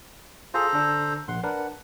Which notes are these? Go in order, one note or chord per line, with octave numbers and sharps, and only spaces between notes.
F4 G#4 A4 C5 A#5
D3 D4
A#1 F#5 C6
D4 A#4 B4 F#5